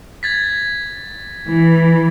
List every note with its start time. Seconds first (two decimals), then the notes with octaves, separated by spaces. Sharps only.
0.23 G#6 A6 B6
1.46 E3